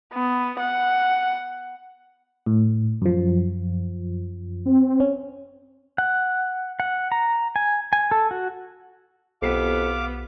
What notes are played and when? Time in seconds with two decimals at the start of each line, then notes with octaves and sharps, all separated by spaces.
0.13 B3
0.60 F#5
2.46 A2
3.02 F#2 F3
4.66 C4
5.00 C#4
5.98 F#5
6.80 F#5
7.12 A#5
7.56 G#5
7.93 G#5
8.11 A4
8.31 F#4
9.42 B1 F2 B3 G4 F5 D6 B6